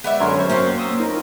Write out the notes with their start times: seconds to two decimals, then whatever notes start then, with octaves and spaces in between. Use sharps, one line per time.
0.04 G#3 B3 D5 E5
0.20 F#2 D3 C#4 C#5 A#5 C6 F6
0.36 F#2 C5 C#6
0.50 A#2 F#3 A#3 C4 C#4
0.78 C6 D#6 E6
1.00 D#4 F4 A#4 A#5